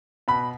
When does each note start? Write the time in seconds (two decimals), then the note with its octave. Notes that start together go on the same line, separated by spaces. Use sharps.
0.28 B2 B5